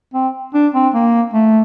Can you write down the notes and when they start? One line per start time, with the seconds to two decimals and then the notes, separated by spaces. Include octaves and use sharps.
0.14 C4
0.54 D4
0.75 C4
0.94 A#3
1.34 A3